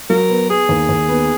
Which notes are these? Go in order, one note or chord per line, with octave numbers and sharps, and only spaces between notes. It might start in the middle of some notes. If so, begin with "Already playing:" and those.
F#3 A#4
B3
B3 G#4
D#2
D#2
B3